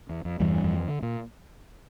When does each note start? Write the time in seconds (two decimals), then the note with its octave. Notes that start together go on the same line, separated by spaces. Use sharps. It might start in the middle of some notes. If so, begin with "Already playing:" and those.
0.09 E2
0.25 F2
0.40 E2 G2 E3 G3
0.64 F2
0.88 D3
1.02 A#2